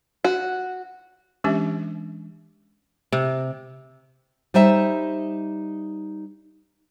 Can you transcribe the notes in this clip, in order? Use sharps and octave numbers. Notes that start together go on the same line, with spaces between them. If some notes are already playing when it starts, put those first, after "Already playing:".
F#4
E3 G#3 C#4 D4 G4 E5
C3
G3 D#4 C5 E5